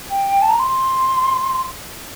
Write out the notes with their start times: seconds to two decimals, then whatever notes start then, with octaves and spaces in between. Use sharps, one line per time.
0.10 G5
0.41 A5
0.50 A#5
0.59 C6